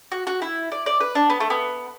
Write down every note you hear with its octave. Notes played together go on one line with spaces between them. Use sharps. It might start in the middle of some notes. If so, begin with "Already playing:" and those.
F#4
F#4
E4
D5
D5
B4
D4
B3
A3
B3